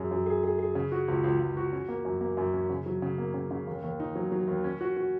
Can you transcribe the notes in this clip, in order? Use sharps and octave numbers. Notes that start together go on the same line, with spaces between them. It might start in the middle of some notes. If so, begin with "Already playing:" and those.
Already playing: F#2 G#4
F#2
G#4
G#4
G#4
C#3
F#4
C#2
C#2
C#2
F#4
C#4
A#3
F#2
A#3
F#2
C#4
C#3
F#3
C#3
A#3
C#3
C#3
D#2
D#2
D#4
F#3
F#3
D#2
C#4
F#4
F#4